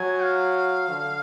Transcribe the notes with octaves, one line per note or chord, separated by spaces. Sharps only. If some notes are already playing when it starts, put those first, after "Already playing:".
Already playing: F#3 G#5
F5
D3